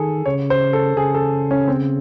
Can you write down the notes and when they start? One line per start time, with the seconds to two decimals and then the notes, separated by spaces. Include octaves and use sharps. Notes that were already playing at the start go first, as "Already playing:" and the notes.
Already playing: D#3 G#4 A4
0.26 C#3 C#5
0.50 C5
0.73 A4
0.97 C#3 G#4
1.14 A4
1.51 C#4
1.68 C4